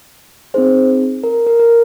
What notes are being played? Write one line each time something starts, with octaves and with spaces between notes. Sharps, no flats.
C4 D#4 G#4 C5
A#4
A#4
A#4